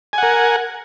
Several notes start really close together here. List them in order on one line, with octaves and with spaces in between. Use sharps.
G#5 F#5 A#4